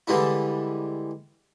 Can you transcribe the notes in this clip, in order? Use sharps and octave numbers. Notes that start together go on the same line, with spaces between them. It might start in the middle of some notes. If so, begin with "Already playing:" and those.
D3 E3 G3 G#3 D4 E4